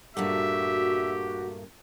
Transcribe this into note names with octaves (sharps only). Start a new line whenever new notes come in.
G2 A#2 A3 F#4 G4 E5